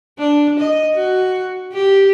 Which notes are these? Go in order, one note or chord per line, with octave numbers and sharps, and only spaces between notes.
D4
D#5
F#4
G4